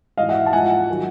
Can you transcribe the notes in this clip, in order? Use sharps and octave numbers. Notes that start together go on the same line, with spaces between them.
G#2 E3 D#5 F5
E5 F#5
A5
G#2 F3 F#5 G#5
D#3 F#3